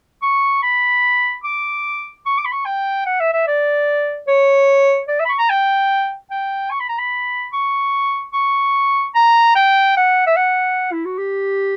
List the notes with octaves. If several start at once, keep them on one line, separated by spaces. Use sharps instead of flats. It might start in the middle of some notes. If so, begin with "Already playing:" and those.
C#6
B5
D6
C#6
D6
B5
C#6
G5
F#5
E5
E5
D5
C#5
D5
E5
B5
C#6
A#5
G5
G5
C#6
B5
A#5
B5
C#6
C#6
A#5
G5
F#5
E5
F#5
E4
F#4
G4